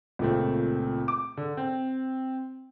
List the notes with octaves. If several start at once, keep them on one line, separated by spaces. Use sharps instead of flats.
C#2 A#2 A3 C4
D6
D3
C4